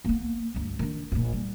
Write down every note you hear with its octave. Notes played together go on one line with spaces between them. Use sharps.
A#3 B3
D2 G2
D#3 D4
E1 A#1
G3